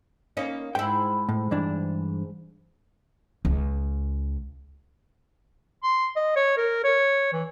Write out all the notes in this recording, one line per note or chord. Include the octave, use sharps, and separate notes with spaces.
A#3 C#4 D#4
G#2 E4 G5
A2
G2 E3 D4
C#2
C6
D#5
C#5
A#4
C#5
E3